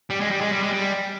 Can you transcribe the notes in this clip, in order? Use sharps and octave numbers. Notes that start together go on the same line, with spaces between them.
G3
G#3
G3
G#3
G3
G#3
G3